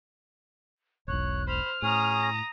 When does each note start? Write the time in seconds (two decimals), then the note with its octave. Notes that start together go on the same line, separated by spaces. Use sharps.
1.08 E1 B1 C#5 F#6
1.47 C5 B5 F6
1.82 A2 C#4 G#4 A#5 D#6
2.21 A#6